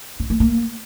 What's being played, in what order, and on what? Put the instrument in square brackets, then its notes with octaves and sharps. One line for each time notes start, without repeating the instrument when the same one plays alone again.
[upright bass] C#4
A#3
A#3